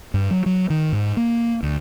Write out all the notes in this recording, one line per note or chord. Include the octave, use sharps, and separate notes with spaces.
G2
F#3
F#3
D#3
G#2
A#3
D2